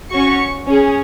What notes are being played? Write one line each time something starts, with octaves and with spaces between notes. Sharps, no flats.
C#4 F#4 C#6
C#4 G#4